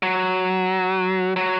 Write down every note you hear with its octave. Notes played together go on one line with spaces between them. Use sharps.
F#3
F#3